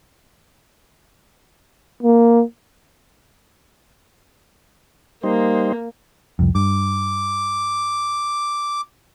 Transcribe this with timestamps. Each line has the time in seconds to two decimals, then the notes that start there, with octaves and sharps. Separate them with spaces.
2.03 A#3
5.23 G3 A#3 D#4 C5
6.39 C2 F2
6.55 G2 D6